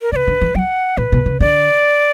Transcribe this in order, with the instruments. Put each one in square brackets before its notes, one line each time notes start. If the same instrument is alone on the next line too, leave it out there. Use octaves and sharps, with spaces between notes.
[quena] A#4
[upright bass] C#3 [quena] D5
[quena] B4
[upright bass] D3
E3
[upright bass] F#3 [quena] G5
[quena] F#5
[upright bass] A#2 [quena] B4
[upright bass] B2
C#3
[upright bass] D3 [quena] D5